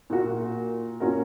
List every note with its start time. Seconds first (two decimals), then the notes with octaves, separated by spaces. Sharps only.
0.10 A#2 A#3 F#4
1.00 A#2 A#3 C#4 F#4 A#4